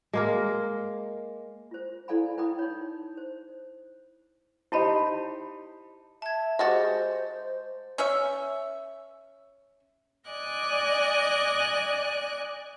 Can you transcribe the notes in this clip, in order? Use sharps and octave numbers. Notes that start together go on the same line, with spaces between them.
G#3 A#3 A#4
F4 C5
E4 A4 D5 F5 G#5 B5
E4 B4 G5 B5 D#6
D#4 C#5
C5
D#4 E4 G4 C5 A5 B5
E5 A5 G#6
G#3 F#4 G4 C5 D#5 A6
C#4 C#5 E5
D5 D#5 G#5 F#6